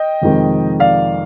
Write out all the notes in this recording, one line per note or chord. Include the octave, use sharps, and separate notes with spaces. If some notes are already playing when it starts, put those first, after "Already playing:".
Already playing: D#5 G5
F1 F2 D#3 G#3
D5 F5